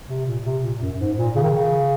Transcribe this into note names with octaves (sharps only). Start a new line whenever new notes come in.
C3
A#2
C3
A#2
F#2
G#2
A#2
C#3
D#3
C#3